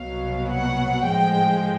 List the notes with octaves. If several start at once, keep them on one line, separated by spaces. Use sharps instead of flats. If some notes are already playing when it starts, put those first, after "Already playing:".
Already playing: C2 B2 F#3 F5
F#5
A2 F3 G#3 G5